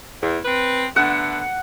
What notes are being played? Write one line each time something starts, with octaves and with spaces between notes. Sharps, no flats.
E2
C4 B4
D3 A3 B3 F#5